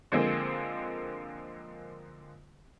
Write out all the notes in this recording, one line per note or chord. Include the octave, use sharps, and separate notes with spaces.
D3 F3 G#3 A#3 C4